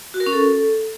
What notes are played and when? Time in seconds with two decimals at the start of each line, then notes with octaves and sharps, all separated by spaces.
0.14 F#4
0.20 A#4
0.26 C#4
0.33 A4